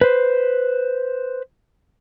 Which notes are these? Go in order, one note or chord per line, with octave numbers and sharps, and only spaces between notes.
B4 C5